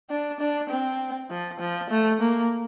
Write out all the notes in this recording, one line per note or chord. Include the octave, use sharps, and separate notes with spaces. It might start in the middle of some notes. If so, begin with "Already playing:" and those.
D4
D4
C4
F3
F3
A3
A#3